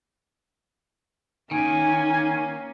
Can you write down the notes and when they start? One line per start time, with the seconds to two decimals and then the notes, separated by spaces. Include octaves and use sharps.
1.51 D#3 A#3 C#4 G#5